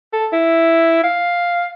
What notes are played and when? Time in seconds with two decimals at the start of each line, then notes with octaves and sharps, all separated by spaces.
0.13 A4
0.33 E4
1.03 F5